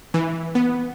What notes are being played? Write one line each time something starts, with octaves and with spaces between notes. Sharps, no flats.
E3
B3